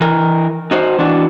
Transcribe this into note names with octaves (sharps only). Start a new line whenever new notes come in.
E3 A#4
D#4 F#4 C5
E3 D4 F#4